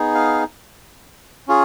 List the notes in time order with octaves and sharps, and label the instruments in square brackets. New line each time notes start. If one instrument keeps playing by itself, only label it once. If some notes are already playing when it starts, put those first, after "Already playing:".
Already playing: [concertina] B3 D#4 G#4
F5
C#4 F4 G#4